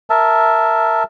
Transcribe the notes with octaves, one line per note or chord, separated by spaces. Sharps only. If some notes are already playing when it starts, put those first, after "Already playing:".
A#4 E5 A5